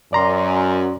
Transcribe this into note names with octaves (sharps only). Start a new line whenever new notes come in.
F#2 D5 A#5 C6